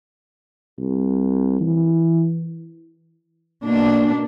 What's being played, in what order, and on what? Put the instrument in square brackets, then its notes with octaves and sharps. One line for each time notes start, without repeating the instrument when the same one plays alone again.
[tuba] C2
E3
[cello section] B2 A#3 D4